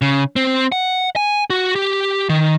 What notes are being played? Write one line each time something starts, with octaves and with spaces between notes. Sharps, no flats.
C#3
C4
F#5
G#5
F#4
G4
D#3